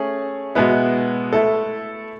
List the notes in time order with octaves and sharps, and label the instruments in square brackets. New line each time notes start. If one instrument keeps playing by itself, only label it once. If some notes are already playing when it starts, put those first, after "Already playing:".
Already playing: [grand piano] A3 C#4 G#4
B2 G#3 B3 E4
A3 E4 A4